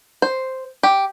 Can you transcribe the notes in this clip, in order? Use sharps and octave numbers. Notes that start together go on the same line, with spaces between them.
C5
G4